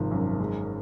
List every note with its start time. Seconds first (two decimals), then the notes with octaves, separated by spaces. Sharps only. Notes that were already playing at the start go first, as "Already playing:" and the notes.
Already playing: G#1 C3 F3
0.11 F#2
0.40 G#3